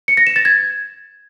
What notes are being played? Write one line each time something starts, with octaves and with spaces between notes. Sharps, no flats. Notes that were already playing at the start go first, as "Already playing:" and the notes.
C#7
A#6
E7
A6
G#6